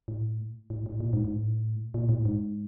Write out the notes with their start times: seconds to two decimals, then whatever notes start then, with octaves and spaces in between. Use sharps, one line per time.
0.08 A2
0.70 A2
0.86 A2
1.00 A#2
1.13 G#2
1.25 G#2
1.35 A2
1.94 A#2
2.09 A2
2.25 G#2